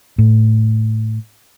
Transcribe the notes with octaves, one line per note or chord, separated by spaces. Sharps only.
A2